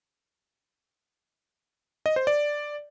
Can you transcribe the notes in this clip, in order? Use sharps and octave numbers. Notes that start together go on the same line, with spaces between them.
D#5
C5
D5